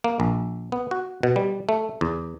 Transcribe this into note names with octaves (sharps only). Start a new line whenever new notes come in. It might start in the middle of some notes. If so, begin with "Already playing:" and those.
A#3
A#1
B3
F#4
B2
G3
A3
E2